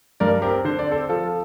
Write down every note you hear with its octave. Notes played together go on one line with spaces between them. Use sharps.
G2 A#4 D5
C4 G4 A#4
D3 C5
D5
C4 A4 C5
F3 F4 A4